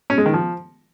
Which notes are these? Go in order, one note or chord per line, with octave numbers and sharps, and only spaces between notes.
C#4
G#3
D#3
F3